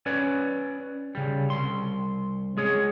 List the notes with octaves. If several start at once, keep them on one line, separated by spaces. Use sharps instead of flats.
C#4 B4 C#5 D5
C#3 G3
C2 C6
G#3 G#4 C#5